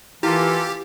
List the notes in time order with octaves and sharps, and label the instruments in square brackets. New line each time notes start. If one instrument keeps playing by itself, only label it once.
[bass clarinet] E3 [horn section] A#3 F4 A4 [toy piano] E4 [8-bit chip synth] G4